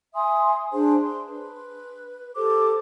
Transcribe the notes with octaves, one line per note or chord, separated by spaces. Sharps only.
E5 G#5 C6 D#6
D4 G#4 C5
C6
B4
G4 A4 C5 D6